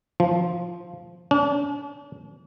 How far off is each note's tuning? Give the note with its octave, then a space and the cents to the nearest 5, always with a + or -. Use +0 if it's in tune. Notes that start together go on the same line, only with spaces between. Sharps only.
F3 -5
D4 -45